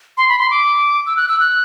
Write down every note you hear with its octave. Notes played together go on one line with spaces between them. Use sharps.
C6
B5
C6
D6
E6
F#6
E6
F#6